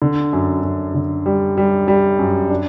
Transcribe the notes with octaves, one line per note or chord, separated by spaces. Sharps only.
D3
F#2
F#2
D3
G3
G3
G3
F#2
D4